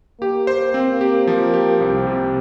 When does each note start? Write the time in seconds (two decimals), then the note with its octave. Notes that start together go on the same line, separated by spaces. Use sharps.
0.21 A#3 G4
0.47 C5
0.74 C4
1.01 G4
1.27 F3
1.53 G4
1.81 C2 C4
2.07 C3